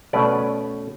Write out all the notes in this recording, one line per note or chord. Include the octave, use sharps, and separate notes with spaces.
B2 A3 C#4 B4 D5